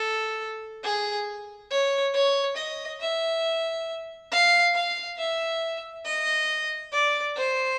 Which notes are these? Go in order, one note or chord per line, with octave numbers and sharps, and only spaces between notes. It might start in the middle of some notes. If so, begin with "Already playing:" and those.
Already playing: A4
G#4
C#5
C#5
D#5
E5
F5
F5
E5
D#5
D5
C5